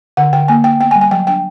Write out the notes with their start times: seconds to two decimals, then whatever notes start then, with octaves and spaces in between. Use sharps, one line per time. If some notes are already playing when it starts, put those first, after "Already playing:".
0.17 D3 F#5
0.33 D3 G5
0.48 A#3 G#5
0.64 A#3 G5
0.80 B3 G5
0.91 G#5
0.96 G3
1.01 G#5
1.11 F#3 G5
1.27 D4 G5